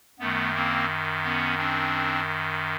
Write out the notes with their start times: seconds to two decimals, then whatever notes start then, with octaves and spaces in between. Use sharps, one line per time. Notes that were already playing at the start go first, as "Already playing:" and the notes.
0.20 F#2 D#3 A3 B3
0.54 A#3 C4
1.24 B3 C#4
1.58 C4 D4